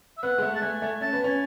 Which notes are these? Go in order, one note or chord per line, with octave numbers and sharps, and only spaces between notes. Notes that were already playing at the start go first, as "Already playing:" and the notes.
E5
B3 F#5
G#3
A3
A5
A3 G#5
A3
C#4 A5
B3
C#4 G#5